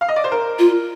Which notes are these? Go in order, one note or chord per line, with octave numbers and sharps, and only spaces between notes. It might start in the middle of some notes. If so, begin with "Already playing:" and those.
F5
D#5
D5
C5
A#4
F4